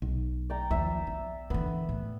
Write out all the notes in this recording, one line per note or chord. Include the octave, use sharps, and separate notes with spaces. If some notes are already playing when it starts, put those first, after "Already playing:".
B1
D5 G5 A#5
D#2 F3 E5
B3
D3 E3 B3
A2